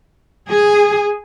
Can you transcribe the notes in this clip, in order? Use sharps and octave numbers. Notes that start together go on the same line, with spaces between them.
G#4